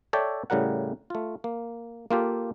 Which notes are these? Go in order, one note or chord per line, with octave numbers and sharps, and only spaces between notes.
A4 C#5 D5 E5 G5
A2 C#3 G3 A#4 F#5
A3 F4
A#3
A#3 F4 G4 A4